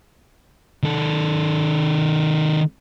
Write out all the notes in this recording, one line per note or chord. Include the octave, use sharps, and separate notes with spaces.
D#3 A4